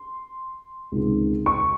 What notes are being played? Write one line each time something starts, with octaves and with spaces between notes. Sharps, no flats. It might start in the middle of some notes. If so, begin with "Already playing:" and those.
Already playing: C6
C#2 C3 D#3
C#6